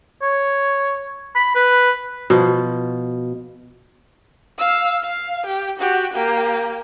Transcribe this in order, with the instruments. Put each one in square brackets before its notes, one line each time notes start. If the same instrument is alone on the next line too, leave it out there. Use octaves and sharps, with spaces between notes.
[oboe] C#5
B5
B4
[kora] B2 F3
[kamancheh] F5 E6
F5
G4
F#4 G4
A#3 G4